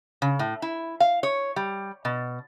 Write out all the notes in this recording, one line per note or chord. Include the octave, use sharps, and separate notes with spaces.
C#3
A2
E4
F5
C#5
G3
B2